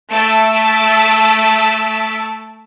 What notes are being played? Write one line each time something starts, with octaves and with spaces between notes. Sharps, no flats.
A3 E5 A5 E6 D7